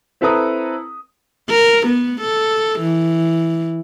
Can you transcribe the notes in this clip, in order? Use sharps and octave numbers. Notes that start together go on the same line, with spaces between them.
C4 E4 A4 B4 A#5 D#6
A#4
B3
A4
E3